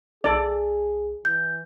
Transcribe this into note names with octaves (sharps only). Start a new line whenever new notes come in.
B1 G#4 A4 D5
E3 G6